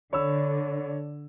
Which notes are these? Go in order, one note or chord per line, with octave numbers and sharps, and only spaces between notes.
D3 C#5 B5 E6